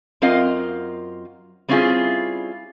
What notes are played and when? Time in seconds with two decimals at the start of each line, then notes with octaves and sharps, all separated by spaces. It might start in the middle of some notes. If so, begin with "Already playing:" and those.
0.22 F#2 C4 F4 A#4 D#5 F5
1.69 G3 C4 C#4 E4 F4 G#4